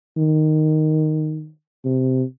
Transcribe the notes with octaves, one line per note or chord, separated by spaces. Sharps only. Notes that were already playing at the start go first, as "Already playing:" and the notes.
D#3
C3